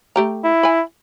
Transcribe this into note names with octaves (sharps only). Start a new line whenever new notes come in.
A3 G4 A#5
E4
G#5 B5